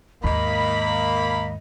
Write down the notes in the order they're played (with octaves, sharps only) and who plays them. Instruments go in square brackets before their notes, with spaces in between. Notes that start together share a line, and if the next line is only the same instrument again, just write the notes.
[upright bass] D#2 G#2 [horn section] A#3 B5 [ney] D#5